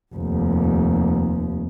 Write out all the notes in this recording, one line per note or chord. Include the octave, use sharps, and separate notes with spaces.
F1 D#2